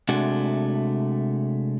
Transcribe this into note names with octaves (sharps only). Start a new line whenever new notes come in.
C3 G#3 A3 D4 F#4